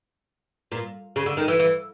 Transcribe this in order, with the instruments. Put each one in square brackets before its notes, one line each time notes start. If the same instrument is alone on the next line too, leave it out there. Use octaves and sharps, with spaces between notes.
[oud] A#2
C#3
D3
D#3
E3
E3